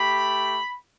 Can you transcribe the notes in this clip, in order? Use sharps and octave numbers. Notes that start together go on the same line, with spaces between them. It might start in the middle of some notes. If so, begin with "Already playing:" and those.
Already playing: A3 G4 B5